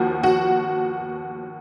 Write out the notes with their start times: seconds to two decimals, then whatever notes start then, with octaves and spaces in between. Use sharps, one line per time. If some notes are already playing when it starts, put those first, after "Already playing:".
Already playing: D#2 F3 F#4
0.23 F#4